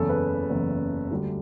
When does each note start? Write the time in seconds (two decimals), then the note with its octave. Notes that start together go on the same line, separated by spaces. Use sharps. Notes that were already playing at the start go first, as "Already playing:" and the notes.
Already playing: F#1 E2 C#3 A4
0.09 B4
0.50 F#1 E2 C#3
1.10 D2 D3 G3